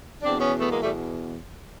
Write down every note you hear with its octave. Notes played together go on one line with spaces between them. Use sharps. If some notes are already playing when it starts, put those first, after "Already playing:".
E2 B2 C4 D4
B3 C#4
A3 B3
G#3 A#3
G3 A3